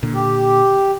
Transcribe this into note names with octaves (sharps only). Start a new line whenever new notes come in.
A#2 D3
G4